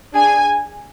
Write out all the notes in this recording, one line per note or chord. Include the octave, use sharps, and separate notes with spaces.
D4 G#4 G#5